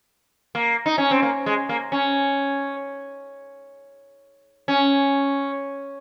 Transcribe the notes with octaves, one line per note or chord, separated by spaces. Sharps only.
A#3
D#4
C#4
C4
A#3
G#3
A#3
C#4
C#4